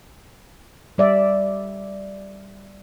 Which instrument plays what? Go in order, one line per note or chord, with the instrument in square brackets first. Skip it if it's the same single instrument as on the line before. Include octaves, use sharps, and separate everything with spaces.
[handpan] G3 D5 E5